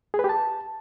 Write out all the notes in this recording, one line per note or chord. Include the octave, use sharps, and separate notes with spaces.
G#4
B4
G4
A5